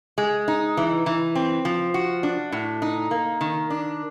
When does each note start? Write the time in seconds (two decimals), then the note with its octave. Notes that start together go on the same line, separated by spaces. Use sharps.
0.18 G#3
0.48 D#4
0.77 E3
1.06 E3
1.35 C4
1.65 F3
1.94 F#4
2.23 D4
2.52 A2
2.82 D#4
3.11 A#3
3.41 D#3
3.70 D4